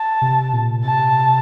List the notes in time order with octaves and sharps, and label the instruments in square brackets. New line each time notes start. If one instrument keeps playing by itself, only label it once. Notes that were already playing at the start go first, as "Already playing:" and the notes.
Already playing: [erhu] A5
[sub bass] C3
A#2
[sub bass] C3 [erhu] A5